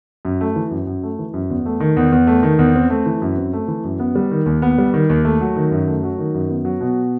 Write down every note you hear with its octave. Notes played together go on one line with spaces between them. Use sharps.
F#2
A3
E3
F#2
F#2
A3
E3
F#2
E2
A3
D#3
E2
E2
A3
D#3
E2
C4
A3
E3
F#2
C4
A3
E3
F#2
B3
G3
D#3
D#2
B3
G3
D#3
D#2
A3
F#3
D#3
F#2
A3
F#3
D#3
F#2
B3
F#3
B2